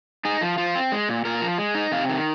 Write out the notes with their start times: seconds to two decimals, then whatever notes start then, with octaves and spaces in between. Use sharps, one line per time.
0.25 D#4 G#4
0.41 F3
0.58 F3 F4
0.75 C4
0.92 G#3
1.09 A#2
1.25 A#2 A#4
1.41 F3
1.58 G#3
1.75 D#4
1.92 C3 F5
2.09 D#3